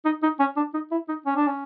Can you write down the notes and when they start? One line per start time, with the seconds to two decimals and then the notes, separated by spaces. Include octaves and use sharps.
0.05 D#4
0.23 D#4
0.40 C#4
0.57 D4
0.74 D#4
0.91 E4
1.08 D#4
1.26 C#4
1.36 D4
1.47 C#4